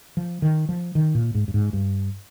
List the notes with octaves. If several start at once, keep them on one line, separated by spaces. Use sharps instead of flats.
F3
D#3
F3
D#3
A#2
G#2
G2
G#2
G2